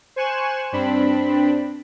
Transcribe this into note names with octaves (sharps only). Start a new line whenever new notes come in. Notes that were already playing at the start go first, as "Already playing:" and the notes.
C5 G#5 C#6 F#6 E7
G2 C4 D4 B5